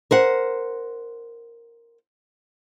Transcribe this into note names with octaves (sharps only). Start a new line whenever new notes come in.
A#4 C5 F#5